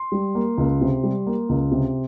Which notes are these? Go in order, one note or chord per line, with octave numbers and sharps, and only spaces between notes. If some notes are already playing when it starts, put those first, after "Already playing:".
Already playing: C6
G3
A#3
C#2
C3
G3
A#3
C#2
C3